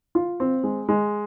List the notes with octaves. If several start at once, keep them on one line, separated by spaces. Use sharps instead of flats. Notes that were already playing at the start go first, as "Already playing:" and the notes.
F4
C4
G#3
G#3